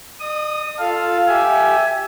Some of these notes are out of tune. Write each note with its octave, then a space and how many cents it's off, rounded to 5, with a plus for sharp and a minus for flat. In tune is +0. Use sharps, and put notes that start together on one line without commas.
D#5 -45 D#6 +0
F4 +0 A4 +0 F5 +0
G4 +0 E5 +0 G#5 +20